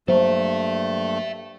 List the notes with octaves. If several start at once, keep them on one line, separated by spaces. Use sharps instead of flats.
G2 F#3 G3 A3 A#3 A4 C5 E5